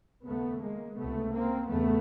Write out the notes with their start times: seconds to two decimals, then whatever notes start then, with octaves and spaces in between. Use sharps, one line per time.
0.25 D#2 C#3 A3 B3
0.60 G#3 A#3
0.96 C#2 C3 A3 B3
1.32 A#3 C4
1.68 E2 C#3 A3 B3